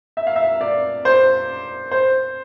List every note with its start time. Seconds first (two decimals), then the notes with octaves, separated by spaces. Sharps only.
0.17 E5
0.27 F5
0.36 E5
0.61 D5
1.05 C5
1.91 C5